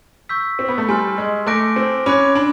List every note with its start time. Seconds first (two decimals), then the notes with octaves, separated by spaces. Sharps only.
0.29 C#6 E6 G6 B6
0.59 C4
0.68 B3
0.78 A3
0.88 G3 G#5 C6 F6
1.18 G#3
1.46 A3 D6 F#6 A#6 D7
1.76 C4
2.06 C#4 B5 D6 F#6
2.35 D4